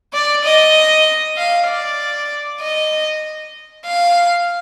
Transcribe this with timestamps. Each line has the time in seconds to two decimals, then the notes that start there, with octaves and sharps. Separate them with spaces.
0.13 D5
0.44 D#5
1.37 F5
1.68 D5
2.61 D#5
3.86 F5